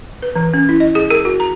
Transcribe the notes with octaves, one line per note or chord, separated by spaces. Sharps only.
B4
E3
C#4
E4
D#5
G#4
A#4
F#4
A#5